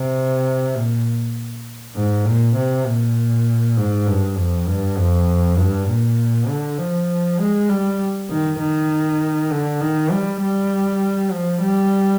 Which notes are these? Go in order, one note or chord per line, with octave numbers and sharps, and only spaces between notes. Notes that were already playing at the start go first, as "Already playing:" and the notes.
Already playing: C3
A#2
G#2
A#2
C3
A#2
G#2
G2
F2
G2
F2
G2
A#2
D3
F3
G#3
G3
D#3
D#3
D3
D#3
G3
G3
F3
G3